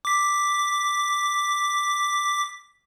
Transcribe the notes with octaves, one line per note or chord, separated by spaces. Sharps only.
D6 B6